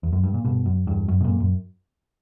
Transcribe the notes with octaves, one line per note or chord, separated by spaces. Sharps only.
E2
F#2
G2
A#2
G2 B2
F#2
E2 G2
F#2
B2
F#2 A#2
F#2